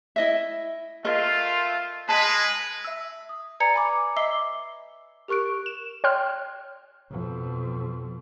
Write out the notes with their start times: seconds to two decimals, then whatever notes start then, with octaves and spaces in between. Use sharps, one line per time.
0.16 E4 D#5 E5
1.05 A3 F4 A#4 D#5
2.09 G#3 B4 A5
2.85 E5 E6
3.29 D#6
3.60 B4 D5 G#5 A#5 G#6 C#7
3.74 G#5 B5 D6
4.16 D#5 E5 D6 E6 C7 G7
5.28 G4 A#4 C#6 F#6 D7
5.66 E7
6.04 C#5 G5 C6 F6 F#6
7.11 F2 B2